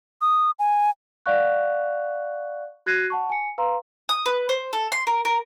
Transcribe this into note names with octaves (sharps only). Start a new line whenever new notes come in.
D#6
G#5
D5 F5 F#5 C#6 F#6
F#4 F#6 G#6 A#6 C7 D#7
F#5 A5 C#6
G#5 C#7
B4 F5 A#5 C6
D#6
B4
C5
A4
C6
A#4
A#4